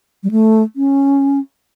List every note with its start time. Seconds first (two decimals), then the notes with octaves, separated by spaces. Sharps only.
0.23 G3
0.31 A3
0.76 C#4